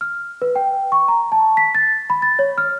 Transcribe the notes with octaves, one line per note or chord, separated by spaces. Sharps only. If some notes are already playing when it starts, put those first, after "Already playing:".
F6
B4
G5
C#6
A#5
A5
B6
A6
B5
A6
C#5
F6